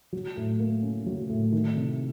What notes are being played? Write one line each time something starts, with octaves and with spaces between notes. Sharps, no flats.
F#3
A2
A#3
C#4
F#3
A2
D#3
C3